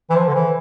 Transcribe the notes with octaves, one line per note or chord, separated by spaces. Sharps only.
E3
F3
D3
E3